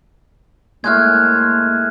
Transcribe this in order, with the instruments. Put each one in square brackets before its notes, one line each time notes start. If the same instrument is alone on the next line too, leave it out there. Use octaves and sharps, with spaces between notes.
[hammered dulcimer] A2 G#3 [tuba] A#3 [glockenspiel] F6 F#6 G#6